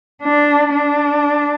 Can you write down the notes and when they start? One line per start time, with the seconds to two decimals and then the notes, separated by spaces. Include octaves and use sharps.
0.22 D4
0.74 D4